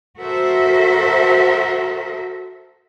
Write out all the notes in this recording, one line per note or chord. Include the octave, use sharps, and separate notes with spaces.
F#4 A4 A#4 C5 E5